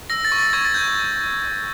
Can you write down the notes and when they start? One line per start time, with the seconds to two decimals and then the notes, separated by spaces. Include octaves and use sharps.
0.10 E6 A#6
0.25 A6
0.32 C#6
0.39 A6
0.53 C#6 G#6
0.65 A6
0.74 G6 G#6